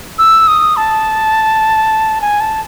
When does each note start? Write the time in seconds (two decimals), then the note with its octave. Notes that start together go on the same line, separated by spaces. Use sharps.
0.18 E6
0.47 D#6
0.77 A5
2.21 G#5
2.40 A5